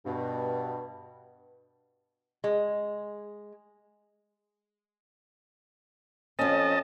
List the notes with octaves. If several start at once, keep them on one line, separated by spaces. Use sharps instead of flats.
G2 B2
G#3
F2 C#4 D#5 A5